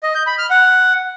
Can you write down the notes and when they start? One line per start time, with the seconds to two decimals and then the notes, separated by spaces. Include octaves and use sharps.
0.03 D#5
0.15 G6
0.27 B5
0.38 F6
0.50 F#5